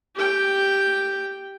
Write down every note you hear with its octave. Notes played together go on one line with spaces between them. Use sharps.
G4 G5